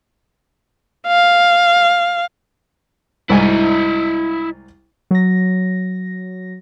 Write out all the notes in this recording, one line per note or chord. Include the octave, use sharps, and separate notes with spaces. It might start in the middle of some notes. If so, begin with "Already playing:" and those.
F5
C2 G#2 E4 D#5 G#5
F#3 A#6